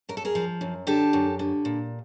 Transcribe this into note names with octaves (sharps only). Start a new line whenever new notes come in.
F#2 A#4
A4
G#4 A#4
F3
F#2
D3 G4 A4
F#2
D3
A#2